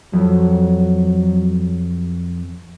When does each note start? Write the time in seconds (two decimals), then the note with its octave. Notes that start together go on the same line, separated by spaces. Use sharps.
0.13 F2 F#3